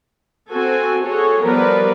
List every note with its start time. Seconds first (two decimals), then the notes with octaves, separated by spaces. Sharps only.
0.51 C4 F#4 A4 G#5
1.03 F#4 G#4 A4 C#5
1.42 F3 G3 B3 A#4 B4 D5